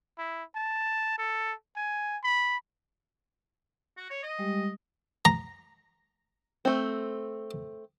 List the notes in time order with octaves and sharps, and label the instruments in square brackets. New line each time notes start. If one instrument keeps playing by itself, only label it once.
[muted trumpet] E4
A5
A4
G#5
B5
[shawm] F#4
C#5
D#5
[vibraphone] G3 G#3 G4
[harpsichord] A#5
[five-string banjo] A3 C4